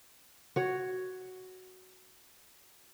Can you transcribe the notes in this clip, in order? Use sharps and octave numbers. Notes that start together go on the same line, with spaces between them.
F#4 C#5